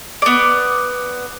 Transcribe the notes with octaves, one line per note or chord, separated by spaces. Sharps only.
B3 D5